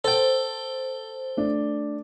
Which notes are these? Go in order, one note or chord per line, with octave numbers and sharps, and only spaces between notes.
A4 C5 G5
A3 D4